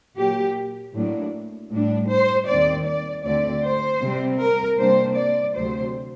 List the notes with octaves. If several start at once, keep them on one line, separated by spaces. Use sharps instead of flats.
A#2 F#3 A#3 G4
A2 F#3 A#3 D4
A2 G3 D4
C5
D#2 D#3 G3 C4 D5
D5
D2 D3 A3 C4 D5
C5
C3 G3 C4
A#4
C3 G3 A#3 D4 C5
D5
D2 C3 F#3 A3 C5